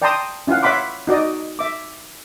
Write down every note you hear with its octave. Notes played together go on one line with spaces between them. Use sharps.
D5 G5 A5 A#5 C6 D#6
C#4 E4 F4 F5 F#5
C#5 E5 F#5 B5 C6 D6
D#4 F#4 D5 D#5
E5 D6